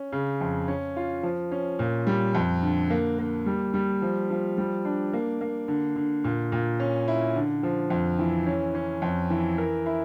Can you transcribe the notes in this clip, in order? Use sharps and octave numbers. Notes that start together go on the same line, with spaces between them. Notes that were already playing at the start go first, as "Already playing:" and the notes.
Already playing: C#4
C#3
F2
C#4
F4
F3
C#4
A#2
G3
F2
D3
A#3
A#3
G3
G3
F3
F3
G3
D4
A#3
A#3
D3
D3
A#2
A#2
C#4
E4
D3
F3
F2
E3
C#4
C#4
F2
E3
A#4
E4